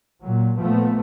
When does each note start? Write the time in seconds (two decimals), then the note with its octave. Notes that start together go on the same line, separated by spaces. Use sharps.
0.23 A#2 F#3
0.58 A#2 F3 A3 B3